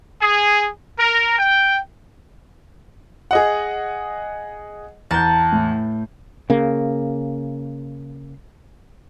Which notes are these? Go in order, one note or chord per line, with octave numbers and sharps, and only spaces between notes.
G#4
A#4
G5
G#4 D#5 F#5
E2 A5 A#5 G6
A2
C#3 A#3